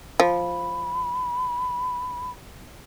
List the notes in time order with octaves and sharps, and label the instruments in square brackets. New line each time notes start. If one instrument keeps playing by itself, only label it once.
[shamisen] F3 [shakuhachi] B5